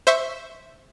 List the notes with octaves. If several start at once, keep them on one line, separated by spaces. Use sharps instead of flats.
C5 E5 C#6